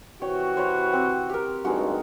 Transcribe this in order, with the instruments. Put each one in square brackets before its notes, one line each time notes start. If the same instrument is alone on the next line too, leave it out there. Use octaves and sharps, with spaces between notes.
[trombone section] C3 E3 F#4 [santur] C#5 G5
[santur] C5 C#5 B5
C4
G4 A#4
[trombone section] A1 G2 [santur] G#3 D#4 F#4